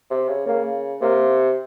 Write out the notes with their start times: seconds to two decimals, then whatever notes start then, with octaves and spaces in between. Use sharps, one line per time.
0.11 C3
0.29 C#3
0.47 C#3 A#3
1.01 C3 A#3